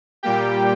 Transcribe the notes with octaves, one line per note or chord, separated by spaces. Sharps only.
A#2 G3 A#3 G4 G5